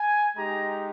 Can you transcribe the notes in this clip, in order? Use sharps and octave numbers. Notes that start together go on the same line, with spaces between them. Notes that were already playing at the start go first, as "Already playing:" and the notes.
Already playing: G#5
G#3 D#4 G4 A#5